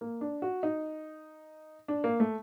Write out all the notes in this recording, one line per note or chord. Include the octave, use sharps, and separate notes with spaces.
A#3
D4
F#4
D#4
D4
A#3
A3